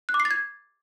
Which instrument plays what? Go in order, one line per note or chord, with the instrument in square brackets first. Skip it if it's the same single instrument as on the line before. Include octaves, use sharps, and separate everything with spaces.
[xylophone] F#6
D6
C7
A6
G#6